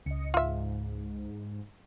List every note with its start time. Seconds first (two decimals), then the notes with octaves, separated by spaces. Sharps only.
0.06 C#2 D#5 C#7
0.34 G#2 F4 E5